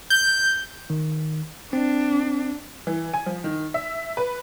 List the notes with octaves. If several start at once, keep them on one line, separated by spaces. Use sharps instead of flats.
G6
D#3
C4 D4
E3
G#5
F3
D#3
E5
B4